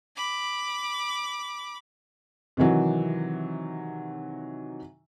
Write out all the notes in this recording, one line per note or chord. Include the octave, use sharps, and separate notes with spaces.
B5 D6
C3 D#3 E3 F#3